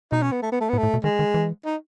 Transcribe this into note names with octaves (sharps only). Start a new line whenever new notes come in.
B2 D#4
C#4
B3
A3
B3
A3
A2 B3
A3
A2
B2
D#3 G#3
D#3
E3
D#4